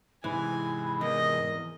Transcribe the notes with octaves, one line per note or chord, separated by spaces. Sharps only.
G#2 C3 E3 G#5 B5
E2 A#4 D#5